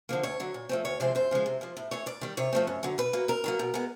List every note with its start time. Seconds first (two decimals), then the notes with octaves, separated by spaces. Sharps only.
0.09 D3 F3 A#3
0.23 D2 C#5
0.40 D3 F#3
0.54 A#2
0.69 F3 A3 C4
0.85 D2 C#5
1.00 C3 F3 G#3 C4 C5
1.15 F#2 C5
1.31 C#3 F3 G#3
1.46 C3
1.61 F3 A#3
1.77 A2
1.91 E3 A3 C#5
2.06 D#2 D5
2.21 D#3 G3
2.37 C3 C#5
2.53 F3 A3 C4
2.67 F#2
2.83 D3 F#3
2.98 B2 B4
3.13 F#3 A#3
3.28 D#2 A#4
3.44 D#3 F#3 A#3
3.59 B2
3.74 G#3 B3